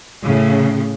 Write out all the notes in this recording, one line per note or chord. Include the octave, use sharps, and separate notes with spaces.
A2 C#3